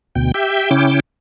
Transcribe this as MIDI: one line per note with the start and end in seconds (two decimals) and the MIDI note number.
0.15 0.32 38
0.15 0.32 47
0.15 0.32 79
0.34 0.70 67
0.34 0.70 76
0.34 0.70 79
0.71 1.00 49
0.71 1.00 61
0.71 1.00 64
0.71 1.00 79
0.71 1.00 86